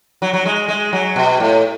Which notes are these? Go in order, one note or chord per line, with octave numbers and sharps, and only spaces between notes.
F#3
F#3
G#3
G#3
F#3
B2
A2